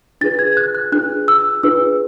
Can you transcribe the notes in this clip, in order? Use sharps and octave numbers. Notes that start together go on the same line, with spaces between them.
D4 F4 G#4 B4 A6
G#6
F#6
F#6
D4 F4 G#4 B4 F#6
E6
D4 F4 G#4 B4 E6